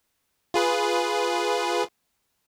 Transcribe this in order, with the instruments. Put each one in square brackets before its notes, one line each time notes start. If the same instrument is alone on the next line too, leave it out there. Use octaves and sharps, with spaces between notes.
[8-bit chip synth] F4 G#4 B4